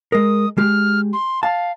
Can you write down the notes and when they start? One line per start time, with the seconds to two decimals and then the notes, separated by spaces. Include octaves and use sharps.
0.12 G#3 A#4 D#6
0.58 G#3 G4 F6
1.13 C6
1.43 F5 A5